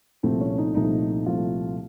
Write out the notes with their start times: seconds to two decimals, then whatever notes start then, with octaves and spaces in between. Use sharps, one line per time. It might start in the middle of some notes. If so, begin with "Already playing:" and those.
0.23 C2 A#2 F3 A3 C4
0.40 C#4
0.58 D#4
0.74 C2 A#2 F3 A3 D#4
1.26 C2 A#2 F3 A3 F4